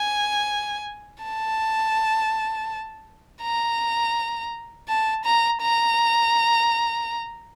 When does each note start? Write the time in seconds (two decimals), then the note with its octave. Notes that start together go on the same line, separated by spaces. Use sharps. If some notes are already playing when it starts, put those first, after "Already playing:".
Already playing: G#5
1.23 A5
3.42 A#5
4.88 A5
5.25 A#5
5.62 A#5